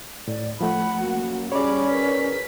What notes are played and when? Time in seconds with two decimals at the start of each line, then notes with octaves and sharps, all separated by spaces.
0.28 A2 D5
0.61 F3 A3 F#5 B5
1.01 F#2 A#3 F#4
1.52 G3 C#4 G#4 C#5 D5 B5 D6
1.89 G#4 A#4 B4 B6